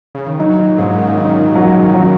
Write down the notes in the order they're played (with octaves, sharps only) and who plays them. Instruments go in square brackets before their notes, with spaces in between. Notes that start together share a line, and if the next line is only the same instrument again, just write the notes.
[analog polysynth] C#3
D#3
[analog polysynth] F#3 [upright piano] D#4
[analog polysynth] A#2
[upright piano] G#2 [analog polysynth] C#3
[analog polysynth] D#3
[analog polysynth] D#3 [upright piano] D#4
[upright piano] F#3
F#3